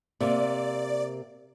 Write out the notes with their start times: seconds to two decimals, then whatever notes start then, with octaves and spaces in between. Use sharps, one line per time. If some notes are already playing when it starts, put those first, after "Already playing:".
0.20 C3 A#3 D5